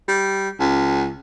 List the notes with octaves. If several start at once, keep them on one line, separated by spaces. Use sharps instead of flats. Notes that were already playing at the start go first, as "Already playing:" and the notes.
G3
C#2